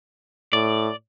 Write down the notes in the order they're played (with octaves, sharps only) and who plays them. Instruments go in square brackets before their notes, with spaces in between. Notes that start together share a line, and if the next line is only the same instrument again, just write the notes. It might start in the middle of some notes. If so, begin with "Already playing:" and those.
[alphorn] A2 [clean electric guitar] D5